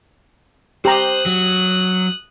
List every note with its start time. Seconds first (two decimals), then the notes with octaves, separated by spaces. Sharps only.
0.85 G4 C5 A#5 D#6 F#6
1.26 F#3